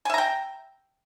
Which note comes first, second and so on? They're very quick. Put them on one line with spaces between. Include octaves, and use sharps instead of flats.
G#5 E5 A#5 G5